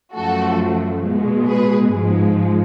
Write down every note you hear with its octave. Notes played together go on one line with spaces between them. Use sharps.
F#2 F3 A3 F#4 A4
B2 G#3
G#4 B4
G#2 F3 G#3